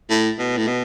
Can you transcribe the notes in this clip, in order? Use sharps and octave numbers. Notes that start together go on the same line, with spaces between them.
A2
B2
A2
B2